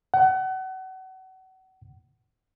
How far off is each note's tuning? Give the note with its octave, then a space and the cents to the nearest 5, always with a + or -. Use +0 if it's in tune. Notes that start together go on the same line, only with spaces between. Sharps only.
F#5 +30